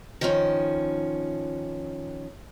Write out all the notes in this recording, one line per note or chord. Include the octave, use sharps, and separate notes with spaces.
D#3 F3 C#4